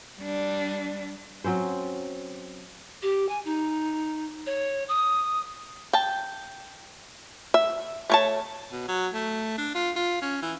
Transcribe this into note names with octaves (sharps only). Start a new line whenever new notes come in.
G3 D4
F#3 C4 C#4 C5
G4
G#5
D#4
C#5
D#6
G5 A5
E5
A3 C#5 A5
B2
F#3
A3
D4
F4
F4
C#4
E3